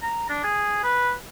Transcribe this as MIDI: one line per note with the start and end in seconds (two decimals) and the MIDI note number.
0.02 0.29 82
0.30 0.41 62
0.44 0.79 68
0.84 1.12 71